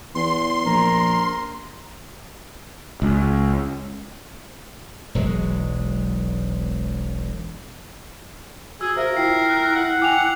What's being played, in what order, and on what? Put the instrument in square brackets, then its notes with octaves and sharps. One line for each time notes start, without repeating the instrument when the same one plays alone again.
[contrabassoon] E2 [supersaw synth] C6
[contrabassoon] A#1 [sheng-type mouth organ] A#4
[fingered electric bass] C#2
[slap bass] E1 B1 F#3 G#3
[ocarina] F#4 [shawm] G#4 [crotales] E6
[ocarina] F#4 [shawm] A#4 [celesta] C5 E5 F5
[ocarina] E4 [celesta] F4 E5 G5 [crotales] C7
[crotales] F#6
[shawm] F#5
[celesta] G5 G#5 [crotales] D6 F7